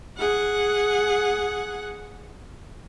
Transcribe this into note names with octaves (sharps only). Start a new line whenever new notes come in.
G#4 F#5